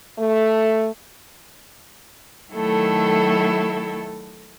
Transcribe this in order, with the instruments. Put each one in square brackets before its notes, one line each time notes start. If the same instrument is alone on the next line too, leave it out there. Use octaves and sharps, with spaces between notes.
[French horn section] A3
[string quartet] D#3 F#3 A3 E4 A4